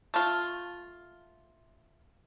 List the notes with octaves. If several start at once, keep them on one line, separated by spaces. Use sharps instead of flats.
A3 F4